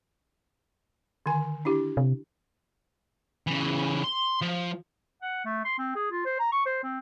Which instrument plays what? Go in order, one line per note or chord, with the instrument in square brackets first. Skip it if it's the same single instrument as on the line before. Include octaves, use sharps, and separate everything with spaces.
[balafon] D3 D#3 G#5
D4 E4 G4
[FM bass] C3
[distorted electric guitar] C#3 E3
C6
F3
[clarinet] F#5
A3
C6
C4
G#4
F4
C5
A#5
C#6
C5
C4